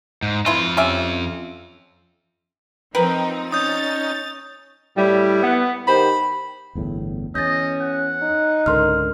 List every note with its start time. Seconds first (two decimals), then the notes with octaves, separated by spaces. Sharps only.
0.23 G#2
0.46 F2 E4 F4 B4 C6
0.77 C#4 G4 E5
2.95 F3 C4 D#4 A#4 B4 G5
3.52 C#4 D#4 D#6 G6 A6
4.97 A2 G3 E4
5.43 B3
5.87 D#3 G4 C5 B5
6.75 G1 E2 A2
7.35 E2 C#4 D#5 G6 A6
7.81 F#5
8.22 D#4
8.66 C#2 G#2 D3 A#4 C6 F6